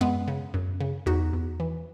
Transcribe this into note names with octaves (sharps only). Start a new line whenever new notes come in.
F#2 G#3 B3
C#3
F#2
C#3
E2 D#4 F#4
E2
E3